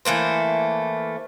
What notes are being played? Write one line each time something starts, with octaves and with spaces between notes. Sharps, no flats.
E3 A3 A#3 C5